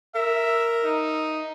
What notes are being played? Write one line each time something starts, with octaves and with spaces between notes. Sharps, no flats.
A#4 E5
D#4